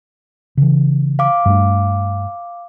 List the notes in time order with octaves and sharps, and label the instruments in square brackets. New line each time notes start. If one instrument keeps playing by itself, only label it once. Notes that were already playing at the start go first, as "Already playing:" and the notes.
[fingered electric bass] C#3 E3
[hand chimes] F5 D6
[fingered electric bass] G2 A3 D4